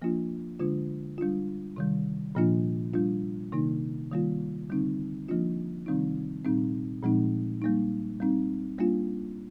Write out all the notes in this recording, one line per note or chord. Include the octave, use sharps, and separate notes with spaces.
F3 A#3 D4 F4
D3 G#3 D4 F4
G3 D4 F4
C3 D#3 G3
A#2 F3 A#3 D4 F4
G3 D4 F4
C3 D#3 A#3 D#4
D#3 G3 A#3 F4
D3 G3 C4 D#4
F3 A#3 D4 F4
C3 D#3 G3 C4 D#4
A#2 G3 C4 D#4
A#2 F3 G#3 C4 D#4
G3 A#3 D#4
G3 C4 D#4
G3 A#3 D4 F4